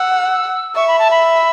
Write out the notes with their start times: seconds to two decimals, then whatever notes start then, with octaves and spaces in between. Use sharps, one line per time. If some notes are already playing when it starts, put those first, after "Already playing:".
Already playing: F#5 E6
0.76 E5 C#6
0.87 B5
0.99 A5
1.11 B5